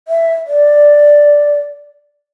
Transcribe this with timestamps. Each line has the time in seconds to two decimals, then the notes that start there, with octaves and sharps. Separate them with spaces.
0.08 E5
0.47 D5